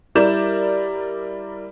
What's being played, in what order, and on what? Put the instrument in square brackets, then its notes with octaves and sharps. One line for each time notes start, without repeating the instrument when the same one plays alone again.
[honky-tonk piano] G3 E4 A#4 D5 G6 E7